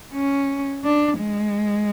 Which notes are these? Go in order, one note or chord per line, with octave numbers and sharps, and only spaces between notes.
C#4
D4
G#3